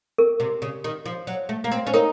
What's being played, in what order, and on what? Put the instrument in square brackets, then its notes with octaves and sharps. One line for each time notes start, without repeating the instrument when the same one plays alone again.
[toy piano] A#4
[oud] C3
C#3
D#3
F3
F#3
A3
A#3
C4
[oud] C#4 [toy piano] C5
[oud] D#4 [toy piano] A#4